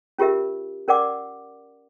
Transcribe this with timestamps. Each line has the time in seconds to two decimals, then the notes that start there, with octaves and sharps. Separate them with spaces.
0.18 C#4 F4 G4 A#4 E5
0.88 C#4 A#4 D5 F#5 D6